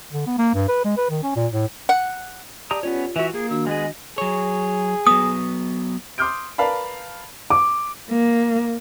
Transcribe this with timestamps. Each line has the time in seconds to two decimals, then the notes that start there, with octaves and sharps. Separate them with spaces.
0.13 D3
0.26 B3
0.38 A#3
0.54 G2
0.68 B4
0.84 G#3
0.97 B4
1.10 D#3
1.23 C#4
1.36 A#2
1.52 A2
1.89 F#5
2.71 G4 D5 A5 A#5 D#6
2.83 B3 C#4 F4 G4 C#5
3.16 E3 F#4 E5
3.34 A#3 G#4
3.50 D#3 D4 F#4 E6
3.66 G#3 B3 G#4 D#5
4.18 F#3 G#4 C#5
5.07 F#3 B3 D#6
6.18 C6 D6 D#6 F6 G6 D7
6.58 A#4 B4 D5 F5 A5 B5
7.50 D6
8.11 A#3